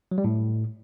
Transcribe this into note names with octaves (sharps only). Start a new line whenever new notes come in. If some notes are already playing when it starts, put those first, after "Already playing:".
F#3
G3
A2